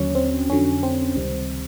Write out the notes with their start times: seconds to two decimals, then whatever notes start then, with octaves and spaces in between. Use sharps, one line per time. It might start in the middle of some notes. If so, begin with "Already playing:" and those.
Already playing: D#2 D3 F#3 C#4
0.15 C4
0.49 F2 D3 F#3 C#4
0.83 C4
1.16 C#2 C3 D#3 G3